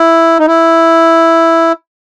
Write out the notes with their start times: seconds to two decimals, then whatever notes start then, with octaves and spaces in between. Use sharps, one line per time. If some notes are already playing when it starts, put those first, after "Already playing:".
Already playing: E4
0.39 D#4
0.47 E4